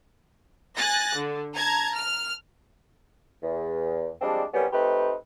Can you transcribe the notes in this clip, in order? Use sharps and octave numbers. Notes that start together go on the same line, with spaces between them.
G#5 F#6 A6 A#6
D3
A5 A#5 G#6
F6
E2
F3 G3 G#3 C4 D4
C2 F#2 G3 B3 C#4
A3 C4 D#4 G4 B4